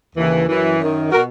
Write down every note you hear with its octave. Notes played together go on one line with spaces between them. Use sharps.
D#2 C#3 E3
F#2 E3
F#2 D#3
B2 F#4 A#4